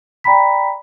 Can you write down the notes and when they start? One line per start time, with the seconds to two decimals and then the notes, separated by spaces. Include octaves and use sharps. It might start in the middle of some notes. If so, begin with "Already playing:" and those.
0.24 D5 G5 A#5 B5 B6